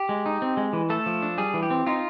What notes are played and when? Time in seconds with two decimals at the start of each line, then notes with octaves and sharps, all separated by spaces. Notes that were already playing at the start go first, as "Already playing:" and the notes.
Already playing: G4
0.09 G#3
0.26 D#4
0.42 C4
0.57 G#3
0.73 E3
0.90 A3 A4
1.06 F3
1.22 D4
1.38 G3 G#4
1.54 E3
1.62 G4
1.70 C4
1.86 D#4 F4